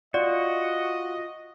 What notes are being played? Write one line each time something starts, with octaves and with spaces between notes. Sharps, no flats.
F4 F#4 D5 D#5